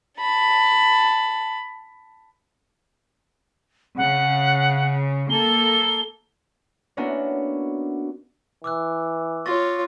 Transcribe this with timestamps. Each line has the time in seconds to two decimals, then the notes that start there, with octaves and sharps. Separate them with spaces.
0.19 A5 B5
3.97 C#3 F#5
5.30 A#3 A4 G7
6.97 A#3 B3 C#4 D4 E4 F#4
8.64 E3 D6 E6 F#6
9.46 F4 C#5 C#6 A6 A#6